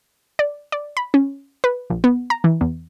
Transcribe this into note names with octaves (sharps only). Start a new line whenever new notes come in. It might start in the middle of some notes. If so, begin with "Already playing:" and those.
D5
D5
B5
C#4
B4
A#1
B3
A#5
E3
E2